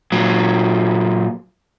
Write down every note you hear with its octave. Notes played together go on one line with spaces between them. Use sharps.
A#2 F#3